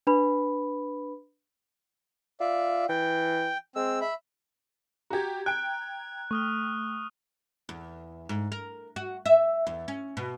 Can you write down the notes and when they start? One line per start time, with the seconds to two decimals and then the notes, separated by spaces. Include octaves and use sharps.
0.07 D4 B4 B5
2.40 F4 D5 E5
2.89 E3 G5
3.76 G#3 C4 E6
4.01 E5 B5
5.10 F#4 G4 A#5 G#6
5.46 G5 F#6 D7
6.31 A3 C#6 D#6 F6
7.69 E2
8.29 G#2
8.52 A#4
8.96 F#4
9.26 E5
9.67 E2
9.88 C#4
10.17 B2